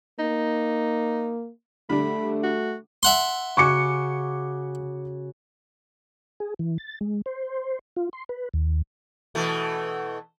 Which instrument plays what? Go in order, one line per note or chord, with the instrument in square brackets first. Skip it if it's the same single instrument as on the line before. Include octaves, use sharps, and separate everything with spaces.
[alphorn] A#3 [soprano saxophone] D#4
[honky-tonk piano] D3 G3 D4 [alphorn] A3 [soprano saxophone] B5
[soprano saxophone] F#4
[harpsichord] E5 F#5 C6
[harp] C#3 F#4 [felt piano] C#6 D6 C#7
[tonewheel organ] G#4
E3
A6
G#3
C5
F4
C6
B4
D#2
[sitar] B2 E3 A3